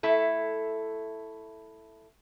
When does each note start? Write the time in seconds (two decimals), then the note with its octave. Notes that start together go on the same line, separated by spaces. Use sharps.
0.03 A3 E4 A4